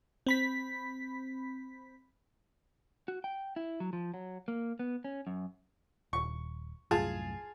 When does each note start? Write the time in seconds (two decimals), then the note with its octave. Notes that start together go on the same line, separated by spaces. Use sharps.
0.27 C4 B5 B6
3.08 F#4
3.24 G5
3.56 E4
3.80 F#3
3.93 F3
4.14 F#3
4.48 A#3
4.79 B3
5.04 C#4
5.27 F#2
6.13 D#1 C#6
6.91 C2 F#2 A2 F4 G#4 A5